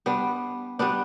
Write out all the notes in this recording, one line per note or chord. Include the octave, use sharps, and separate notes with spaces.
G3 B3 D4
G3 B3 D4